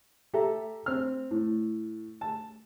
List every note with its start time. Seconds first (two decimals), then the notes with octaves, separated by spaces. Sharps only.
0.34 G4 A4 E5 A#5
0.86 C4 F6
1.31 A2
2.21 A5